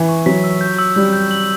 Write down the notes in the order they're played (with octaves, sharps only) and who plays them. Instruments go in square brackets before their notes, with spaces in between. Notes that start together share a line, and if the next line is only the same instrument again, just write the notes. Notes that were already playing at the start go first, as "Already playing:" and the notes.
Already playing: [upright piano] E3
[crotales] C#6
[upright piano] F#3 [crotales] B6
[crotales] E6
G6
E6
[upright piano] G3 [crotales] G6
[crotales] G6
F#7